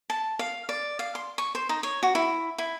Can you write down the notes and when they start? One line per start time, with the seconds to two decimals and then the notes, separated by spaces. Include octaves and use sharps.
0.10 A5
0.39 F5
0.69 D5
0.99 F5
1.15 C6
1.38 C#6
1.55 C5
1.69 D#4
1.83 C#5
2.03 F#4
2.15 E4
2.58 E4